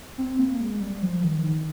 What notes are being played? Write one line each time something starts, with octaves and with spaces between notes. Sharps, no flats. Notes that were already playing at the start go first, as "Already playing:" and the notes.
C4
A#3
G#3
G3
F3
D#3
D#3